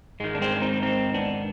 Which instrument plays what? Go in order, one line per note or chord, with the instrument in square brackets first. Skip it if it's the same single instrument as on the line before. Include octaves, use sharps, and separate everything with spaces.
[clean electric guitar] G#2 D#3 G#3
D4
G#3 C4
D4
C4 D#4
C4 D#4
B3 D4